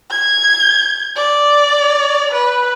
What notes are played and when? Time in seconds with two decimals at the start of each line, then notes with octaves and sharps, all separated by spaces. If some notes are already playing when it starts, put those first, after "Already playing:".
0.11 G#6
1.16 D5
2.31 B4